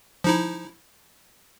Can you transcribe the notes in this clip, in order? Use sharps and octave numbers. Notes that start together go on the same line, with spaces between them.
F3 D#4 E4